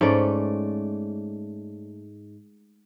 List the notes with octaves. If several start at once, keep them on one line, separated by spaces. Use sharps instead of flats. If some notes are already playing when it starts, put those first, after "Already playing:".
G#2 A3 C#4 D5